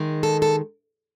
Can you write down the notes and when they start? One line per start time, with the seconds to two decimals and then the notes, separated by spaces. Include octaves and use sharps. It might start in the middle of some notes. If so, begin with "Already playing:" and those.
Already playing: D#3 G#3
0.23 A4
0.42 A4